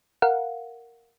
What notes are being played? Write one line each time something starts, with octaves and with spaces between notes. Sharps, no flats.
A#4 F5 F#5